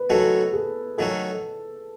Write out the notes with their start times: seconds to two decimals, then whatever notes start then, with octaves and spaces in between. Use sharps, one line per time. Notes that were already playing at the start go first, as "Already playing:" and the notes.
Already playing: B4
0.10 D#3 F#3 A3 C#4 F#4 A4
0.53 G#4
0.98 D#3 F#3 A3 C#4 F#4 A4